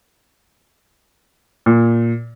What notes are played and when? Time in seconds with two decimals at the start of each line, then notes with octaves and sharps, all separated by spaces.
1.66 A#2